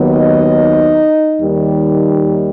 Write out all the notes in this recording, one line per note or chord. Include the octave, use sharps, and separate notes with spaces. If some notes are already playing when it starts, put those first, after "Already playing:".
Already playing: D#2 D#3 F#3 B3
D#4 D#5
D#2 D#3 G3